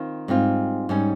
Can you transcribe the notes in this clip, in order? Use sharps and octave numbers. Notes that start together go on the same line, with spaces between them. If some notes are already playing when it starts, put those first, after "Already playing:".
Already playing: D#3 C4 F4
G#2 G3 C4 F4
G#2 G3 C#4